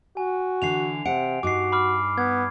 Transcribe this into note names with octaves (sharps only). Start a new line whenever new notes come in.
F#4 G#5
D3 E3 C7 F7
C3 F#5 D7
G2 D#4 F#4 D6 C7
B5 D6 F6
B3 G#6